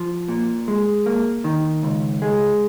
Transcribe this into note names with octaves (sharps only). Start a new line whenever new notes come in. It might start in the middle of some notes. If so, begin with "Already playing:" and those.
Already playing: F3
A#2
G#3
A#3
D#3
C#2
G#3